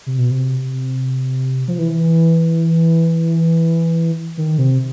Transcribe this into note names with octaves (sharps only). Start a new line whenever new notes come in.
C3
B2
C3
F3
E3
D#3
C3